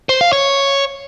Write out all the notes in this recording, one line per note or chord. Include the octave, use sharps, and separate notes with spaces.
C5
F5
C#5